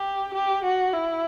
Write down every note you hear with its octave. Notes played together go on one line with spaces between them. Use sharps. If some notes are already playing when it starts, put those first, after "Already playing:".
Already playing: G4
G4
F#4
E4